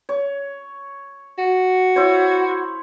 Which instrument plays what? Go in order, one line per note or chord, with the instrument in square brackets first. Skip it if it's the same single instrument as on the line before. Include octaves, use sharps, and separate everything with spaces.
[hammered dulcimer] C#5
[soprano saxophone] F#4
[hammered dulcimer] E4 C5 C#5